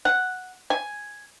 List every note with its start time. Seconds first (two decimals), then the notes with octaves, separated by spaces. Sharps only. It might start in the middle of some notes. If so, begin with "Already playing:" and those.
0.05 F#5
0.70 G#5